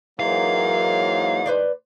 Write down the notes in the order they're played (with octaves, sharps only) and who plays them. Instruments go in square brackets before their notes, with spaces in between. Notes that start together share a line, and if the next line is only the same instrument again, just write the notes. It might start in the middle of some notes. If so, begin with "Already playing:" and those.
[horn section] G#2 E3 D#4 [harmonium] F#3 A#3 [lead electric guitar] F5
[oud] B4 C5 D5